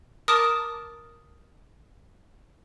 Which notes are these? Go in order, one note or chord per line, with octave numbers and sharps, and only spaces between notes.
A#4 A5 D6 D#6